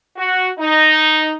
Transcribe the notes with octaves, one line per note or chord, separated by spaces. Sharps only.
F#4
D#4